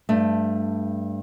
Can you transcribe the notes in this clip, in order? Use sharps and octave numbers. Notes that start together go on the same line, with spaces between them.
G2 A3